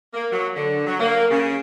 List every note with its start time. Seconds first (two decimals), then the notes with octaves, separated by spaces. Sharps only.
0.14 A#3
0.32 F#3
0.56 D3
0.86 F#3
1.00 A#3
1.31 C#3